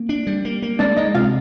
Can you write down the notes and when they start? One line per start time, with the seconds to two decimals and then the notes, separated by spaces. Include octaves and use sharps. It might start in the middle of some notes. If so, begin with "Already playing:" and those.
Already playing: A#3
0.09 D4
0.27 G3
0.45 A#3
0.62 A#3
0.79 G#3 D4 D5
0.97 G#3 D#4 D#5
1.15 C3 F4 F5